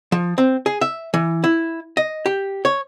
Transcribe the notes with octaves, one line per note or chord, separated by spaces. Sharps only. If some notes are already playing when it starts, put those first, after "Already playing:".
F3
C4
G#4
E5
E3
E4
D#5
G4
C#5